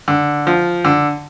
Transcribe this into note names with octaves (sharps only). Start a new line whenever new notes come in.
D3
F3
D3